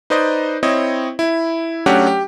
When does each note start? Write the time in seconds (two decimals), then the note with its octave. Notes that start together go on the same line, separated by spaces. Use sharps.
0.10 D#4 B4 C5 D5 D#5
0.63 C4 E4 C#5 D#5
1.19 E4
1.86 F#3 A3 C#4 D4 G4 F#5
2.07 G4